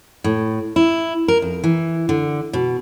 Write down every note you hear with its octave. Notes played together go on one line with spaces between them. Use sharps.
A2
E4
A#4
F2
E3
D3
B2